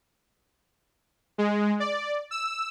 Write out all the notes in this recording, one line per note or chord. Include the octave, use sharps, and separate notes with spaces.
G#3
D5
E6